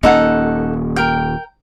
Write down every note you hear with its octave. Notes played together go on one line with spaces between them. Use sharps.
D#1 A#3 C#4 D#4 A4 F#5
A#4 G5